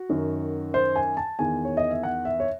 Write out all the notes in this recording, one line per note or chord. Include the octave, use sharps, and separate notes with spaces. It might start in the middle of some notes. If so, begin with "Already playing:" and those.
Already playing: F#4
F#2 D#3
C5
G#5
A5
E2 D#3 G#5
C#5
D#5
E5
F#5
E5
C#5